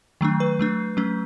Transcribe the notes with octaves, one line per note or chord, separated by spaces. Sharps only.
D#3 F#3 A3 D4
B4
F#3 A3 D4
F#3 A3 C#4